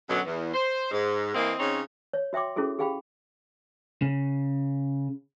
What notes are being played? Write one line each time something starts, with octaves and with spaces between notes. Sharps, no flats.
F#2 B2 D3 F#3
E2
C5
G#2
E3 A#3 C4 D#5
C#3 C4 C#4 D#4
C#5
F#4 E5 G5 C6 D6
C#4 E4 F#4 G#4 A4
G4 G#4 F5 G5 B5
C#3